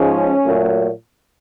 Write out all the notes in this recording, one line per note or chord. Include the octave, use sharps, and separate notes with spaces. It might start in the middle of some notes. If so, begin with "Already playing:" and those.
Already playing: G#2 F3 G#3 C#4
A#2 F#3 A3